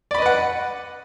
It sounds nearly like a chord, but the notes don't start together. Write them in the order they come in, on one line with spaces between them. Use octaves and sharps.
D5 B5 D#5 B4 F#5